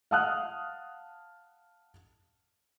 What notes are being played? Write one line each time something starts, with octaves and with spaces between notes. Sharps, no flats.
F5 F#5 A5 D#6 F6 F#6